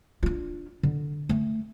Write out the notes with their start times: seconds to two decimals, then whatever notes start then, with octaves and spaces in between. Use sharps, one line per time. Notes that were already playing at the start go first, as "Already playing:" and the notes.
0.23 D4 F4
0.83 D3
1.29 A3